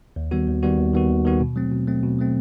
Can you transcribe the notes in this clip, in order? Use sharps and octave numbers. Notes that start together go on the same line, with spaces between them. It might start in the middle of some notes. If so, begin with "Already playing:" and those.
D#2
D#3 G3 B3 F#4
D#2
D#3 G3 B3 F#4
D#2
D#3 G3 B3 F#4
D#2
D#3 G3 B3 F#4
B2
F#3 A3 C4
B2
F#3 A3 C4
B2
F#3 A3 C4